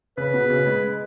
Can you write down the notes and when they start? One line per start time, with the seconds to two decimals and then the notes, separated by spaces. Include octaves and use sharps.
0.17 C#3 B4
0.34 B2
0.50 C#3
0.67 G#3